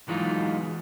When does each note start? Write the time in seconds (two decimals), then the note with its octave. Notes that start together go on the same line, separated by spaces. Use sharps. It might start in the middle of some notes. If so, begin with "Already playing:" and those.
0.08 E3 F#3 G#3 B3 D#4 F4